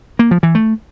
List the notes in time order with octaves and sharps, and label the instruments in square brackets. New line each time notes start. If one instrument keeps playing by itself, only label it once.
[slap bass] A#3
F3
E3
A3